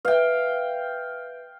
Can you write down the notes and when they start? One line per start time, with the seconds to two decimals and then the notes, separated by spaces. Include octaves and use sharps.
0.05 B4 E5 F5 G5